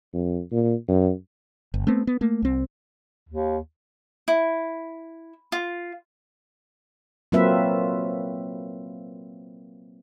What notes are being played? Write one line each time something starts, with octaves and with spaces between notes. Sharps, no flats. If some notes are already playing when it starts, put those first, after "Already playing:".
F2
A#2
F#2
G1
A3 B3 C4
B3
A3 A#3
C2 C4
D#2
E4
F4
F#3 A#3 C4 F4 B4 E5